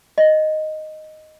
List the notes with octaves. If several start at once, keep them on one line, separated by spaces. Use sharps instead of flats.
D#5